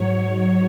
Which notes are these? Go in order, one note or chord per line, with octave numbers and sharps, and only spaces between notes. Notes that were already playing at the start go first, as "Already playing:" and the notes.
Already playing: G#2 F#3 C#5